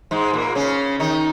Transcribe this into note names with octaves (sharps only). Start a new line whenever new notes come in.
G#2 G#3
A#2 A#3
C#3 C#4
D#3 D#4